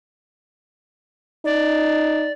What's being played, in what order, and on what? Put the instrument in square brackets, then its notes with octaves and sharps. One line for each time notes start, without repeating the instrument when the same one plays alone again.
[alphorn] D#4 [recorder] D5